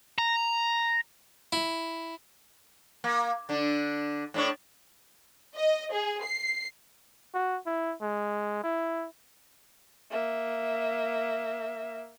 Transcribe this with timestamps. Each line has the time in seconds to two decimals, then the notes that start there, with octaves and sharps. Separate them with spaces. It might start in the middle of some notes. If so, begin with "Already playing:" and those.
0.18 A#5
1.52 E4
3.04 A#3
3.49 D3 D4
4.34 A2 D4 C#5
5.56 D#5
5.92 G#4
6.23 C7
7.34 F#4
7.66 E4
8.02 G#3
8.64 E4
10.11 A#3 E5